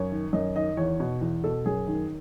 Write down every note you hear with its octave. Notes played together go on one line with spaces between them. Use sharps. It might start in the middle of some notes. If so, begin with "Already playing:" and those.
Already playing: F#2 C#5
D#3
F#2 D#5
D#3 D#5
E2 C#5
B2
E2
B2 A4
F#2 G#4
D#3